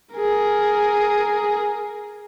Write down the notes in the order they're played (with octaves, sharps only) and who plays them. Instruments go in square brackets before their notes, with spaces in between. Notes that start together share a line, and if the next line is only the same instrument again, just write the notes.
[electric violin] G#4 A#4